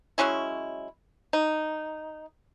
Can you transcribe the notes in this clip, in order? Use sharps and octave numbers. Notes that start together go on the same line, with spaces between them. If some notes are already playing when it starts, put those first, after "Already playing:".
F#3 G#3 C#4 E4
D#4